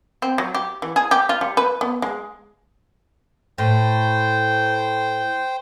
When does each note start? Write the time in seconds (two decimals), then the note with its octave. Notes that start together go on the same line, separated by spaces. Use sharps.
0.22 C4
0.38 F#3
0.54 G4
0.82 E3
0.96 G#4
1.11 G4
1.29 F4
1.41 G3
1.57 B4
1.81 B3
2.02 G#3
3.58 A2 C5 G5